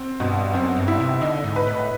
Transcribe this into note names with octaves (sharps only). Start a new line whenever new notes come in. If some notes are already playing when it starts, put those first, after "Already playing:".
Already playing: C4
G2 B2
F#2 C4
G2
E4
C3
D3 D#4
G#2
B4
A2